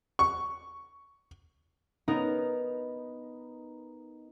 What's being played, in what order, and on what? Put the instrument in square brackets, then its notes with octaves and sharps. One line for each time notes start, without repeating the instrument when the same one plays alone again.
[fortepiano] C#6
[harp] B3 D#4 A#4